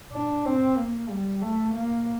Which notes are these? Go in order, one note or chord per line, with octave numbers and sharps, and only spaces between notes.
D4
C4
A#3
G3
A3
A#3